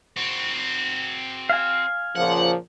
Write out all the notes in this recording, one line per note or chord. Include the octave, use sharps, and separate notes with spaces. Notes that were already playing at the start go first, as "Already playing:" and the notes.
C4 F#4
F5 G#5
A#2 C#3 F3 F#5